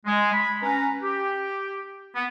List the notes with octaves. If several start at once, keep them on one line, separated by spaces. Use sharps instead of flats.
G#3
B5
C#4 B4 A#5
G4
B3